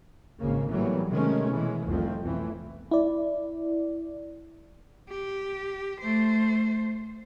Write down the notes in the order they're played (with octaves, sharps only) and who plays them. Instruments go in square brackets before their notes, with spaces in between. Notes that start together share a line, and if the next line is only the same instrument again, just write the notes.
[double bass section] G#1 C#3 A#3
A2 E3 F#3 G3 A#3 B3
C3 D#3 G#3 A3 C#4
B2 E3 G#3
F1 C2 F2 F3 A3 C4
B1 F2 E3 A3
[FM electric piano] E4 D5
[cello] G4
A3 C5